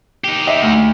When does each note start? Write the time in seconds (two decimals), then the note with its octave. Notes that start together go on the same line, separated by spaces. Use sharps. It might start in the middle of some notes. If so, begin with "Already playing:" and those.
0.24 D#4 G4
0.47 D#5 E5
0.62 D2